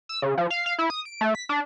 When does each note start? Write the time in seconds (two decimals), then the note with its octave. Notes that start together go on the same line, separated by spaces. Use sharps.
0.09 E6
0.22 C#3
0.38 F3
0.50 F5
0.66 F5
0.79 E4
0.90 D#6
1.05 D7
1.21 A3
1.35 B6
1.49 D4